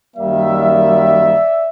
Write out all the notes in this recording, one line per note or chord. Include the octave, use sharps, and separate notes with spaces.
F#2 D#3 G3 A#3 D5 E5